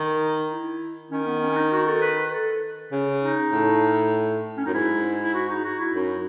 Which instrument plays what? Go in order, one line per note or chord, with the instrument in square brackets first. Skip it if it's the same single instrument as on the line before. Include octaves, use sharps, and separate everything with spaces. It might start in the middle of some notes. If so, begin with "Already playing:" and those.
Already playing: [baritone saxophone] D#3
[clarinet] D#4
E4
[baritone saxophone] D#3 [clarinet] C#4
[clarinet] B3
C#4
C#4
D#4
F#4
A4
B4
B4
A4
[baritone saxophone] C#3
[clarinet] D#4
[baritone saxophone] A2
[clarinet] C#4
[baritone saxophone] F#2 [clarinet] D#4
[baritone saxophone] G#2 [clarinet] E4
[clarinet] E4
F#4
D#4
F#4
E4
[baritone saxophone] F#2 [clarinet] D#4